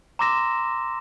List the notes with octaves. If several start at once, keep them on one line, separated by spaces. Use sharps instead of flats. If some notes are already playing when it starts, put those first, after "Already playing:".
A#5 C6 D6 E6 A#6 E7